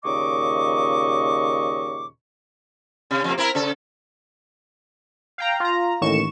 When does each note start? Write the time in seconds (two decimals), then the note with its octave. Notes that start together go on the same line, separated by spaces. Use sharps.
0.05 D#2 A#2 C#3 D#5 C#6 D6
3.11 C3
3.24 F2 C3 A#3
3.38 C4 E4 A#4
3.55 C#3 A4
5.38 F5 G5 A#5
5.60 F4 A#5
6.01 A1 D#2 A2 C#6 E7